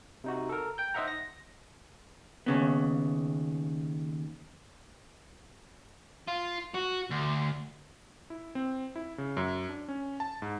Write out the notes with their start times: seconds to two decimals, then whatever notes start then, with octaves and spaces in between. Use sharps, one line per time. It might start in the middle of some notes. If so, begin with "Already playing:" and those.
0.24 C3 D#4 F#4
0.49 A4 A#4
0.78 G5 G6
0.94 D#4 C5 D#5 E5 F#5 A#5
1.08 A#6
2.46 D#2 C#3 B3
6.28 F4
6.75 F#4
7.11 D2
8.30 E4
8.55 C4
8.96 E4
9.18 C#3
9.37 F#2
9.69 D4
9.89 C#4
10.20 A5
10.42 G#2